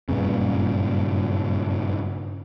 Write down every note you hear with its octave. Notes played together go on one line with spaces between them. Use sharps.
F#1 G2 A#2 C#3